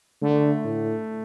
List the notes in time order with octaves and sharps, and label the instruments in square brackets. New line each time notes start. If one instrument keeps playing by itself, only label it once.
[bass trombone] D3 [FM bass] A3
[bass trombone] A2